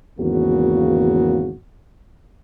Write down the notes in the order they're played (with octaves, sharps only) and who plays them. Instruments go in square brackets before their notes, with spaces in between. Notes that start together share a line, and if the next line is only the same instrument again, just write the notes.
[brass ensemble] G#1 E2 C#3 A#3 F#4